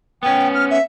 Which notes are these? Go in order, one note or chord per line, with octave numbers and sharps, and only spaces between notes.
B3 C#4 G5
F6
E5